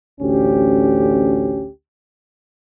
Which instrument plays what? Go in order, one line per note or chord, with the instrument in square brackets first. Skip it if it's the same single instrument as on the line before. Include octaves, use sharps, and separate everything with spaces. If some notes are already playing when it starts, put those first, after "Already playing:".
[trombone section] A1 D2 C#4 G4